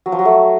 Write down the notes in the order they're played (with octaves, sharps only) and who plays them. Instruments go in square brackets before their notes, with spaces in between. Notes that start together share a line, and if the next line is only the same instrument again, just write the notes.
[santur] F#3
F3
F#3
A3